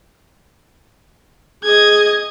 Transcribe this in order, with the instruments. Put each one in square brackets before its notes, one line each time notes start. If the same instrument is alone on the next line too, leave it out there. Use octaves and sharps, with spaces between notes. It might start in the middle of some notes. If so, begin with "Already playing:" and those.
[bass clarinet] G#4 [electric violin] D#5 G#6